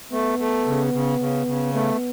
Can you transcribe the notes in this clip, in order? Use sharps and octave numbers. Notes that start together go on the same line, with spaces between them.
A3 B3
A3
C#3
C#3
C#3
C#3
A3 B3